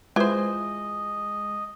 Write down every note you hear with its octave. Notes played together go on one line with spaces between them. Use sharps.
E3 G#3 F4 B4 C5 D#5